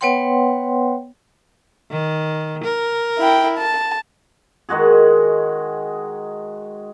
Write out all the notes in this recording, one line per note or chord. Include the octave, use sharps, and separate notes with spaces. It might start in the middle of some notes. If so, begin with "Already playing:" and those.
B3 B4 C#5 F#5 G5 C6
D#3
A#4
E4 G5
A5
D#3 G#3 F#4 G#4